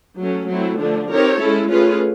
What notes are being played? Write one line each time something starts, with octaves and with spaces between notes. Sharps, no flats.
F#3 A3 C#4
F#3 A3 C4 E4
D3 F3 A3 D4
C4 D#4 G4 A#4 C#5
G#3 C#4 E4 A4
A3 C#4 F4 G#4 B4